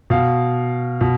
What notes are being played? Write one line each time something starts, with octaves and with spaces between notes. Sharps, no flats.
B2 F5
B2